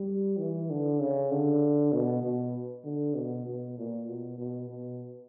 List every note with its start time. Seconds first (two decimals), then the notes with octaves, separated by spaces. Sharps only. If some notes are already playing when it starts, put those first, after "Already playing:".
Already playing: G3
0.38 E3
0.70 D3
1.00 C#3
1.31 D3
1.92 B2
2.23 B2
2.84 D3
3.15 B2
3.46 B2
3.78 A#2
4.08 B2
4.38 B2
4.69 B2